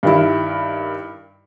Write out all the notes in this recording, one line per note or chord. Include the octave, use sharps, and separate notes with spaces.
G2 D#3 E4